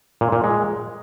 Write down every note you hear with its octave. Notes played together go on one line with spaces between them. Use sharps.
A#2
A#2
G#3